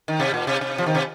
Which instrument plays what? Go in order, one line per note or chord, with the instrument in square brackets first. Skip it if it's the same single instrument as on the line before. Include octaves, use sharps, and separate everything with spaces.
[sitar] D#3
C3
A#2
C3
C3
F3
D#3
C3